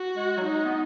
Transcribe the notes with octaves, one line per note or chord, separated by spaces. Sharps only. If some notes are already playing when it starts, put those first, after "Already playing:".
Already playing: F#4
G#3
F#3
G#3 D#4
B3